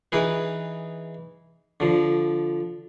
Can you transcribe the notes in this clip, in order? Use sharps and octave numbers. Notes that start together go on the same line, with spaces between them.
E3 D#4 G#4 B4
D3 F3